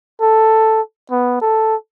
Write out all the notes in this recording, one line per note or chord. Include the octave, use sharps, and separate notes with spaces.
A4
B3
A4